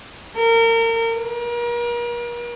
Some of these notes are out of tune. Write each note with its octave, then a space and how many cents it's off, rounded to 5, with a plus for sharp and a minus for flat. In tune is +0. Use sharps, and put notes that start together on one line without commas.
A#4 -30
A#4 +40